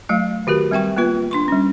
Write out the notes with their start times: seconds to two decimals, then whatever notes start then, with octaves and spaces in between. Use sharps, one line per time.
0.09 F#3 A3 F5
0.47 D#3 F#4 G4 A#4
0.71 G3 C4 E5 G5 C#6
0.96 A#3 B3 F4 B4
1.31 D4 C6 C#6
1.48 G3 C#4